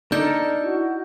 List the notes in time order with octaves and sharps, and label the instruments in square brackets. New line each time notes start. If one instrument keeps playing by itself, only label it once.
[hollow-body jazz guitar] D4 [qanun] D#4 A4 A#4 [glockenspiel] G6
[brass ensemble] E4 F#4